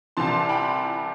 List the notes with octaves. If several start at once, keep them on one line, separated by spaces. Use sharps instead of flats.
C2 C3 E3 A5 C6
G5 B5